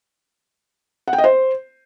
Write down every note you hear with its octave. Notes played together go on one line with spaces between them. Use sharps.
F#5
G5
D#5
C5